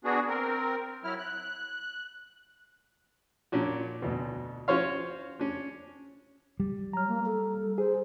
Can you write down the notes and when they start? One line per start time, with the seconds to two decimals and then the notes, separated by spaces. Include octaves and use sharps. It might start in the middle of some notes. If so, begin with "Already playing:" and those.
0.05 B3 D4 F#4 G#4
0.28 C4 A#4
1.04 F#3 E4 F6
1.19 F#6
3.52 A#2 C#4 D4 F#4
4.02 D2 B2
4.68 C#4 F4 F#4 C5 C#5 F5
5.39 C#4 D4
6.60 G3
6.93 F#3 A#5 F6
7.08 A#3
7.26 A4
7.78 G#4 C5